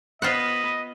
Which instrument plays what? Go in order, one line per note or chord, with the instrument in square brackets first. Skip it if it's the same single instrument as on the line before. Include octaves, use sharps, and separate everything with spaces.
[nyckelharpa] B3 B4 [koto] F4 C5 F#5 [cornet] D#5